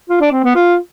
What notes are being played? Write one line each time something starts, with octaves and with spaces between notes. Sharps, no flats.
F4
D4
C4
B3
F4